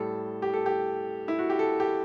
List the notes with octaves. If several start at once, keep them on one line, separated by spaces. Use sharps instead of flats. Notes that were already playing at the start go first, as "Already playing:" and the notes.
Already playing: A2 G3 A4
G4
A4
G4
E4
F#4
G4
A4
G4